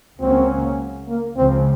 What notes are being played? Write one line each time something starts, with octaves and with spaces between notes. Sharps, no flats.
C#2 C#3 F#3 A#3 C4 C#4
A#3
C#2 C#3 F3 C4